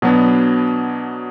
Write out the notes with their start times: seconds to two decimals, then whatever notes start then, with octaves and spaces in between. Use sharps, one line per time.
0.02 B2 F#3 B3 D4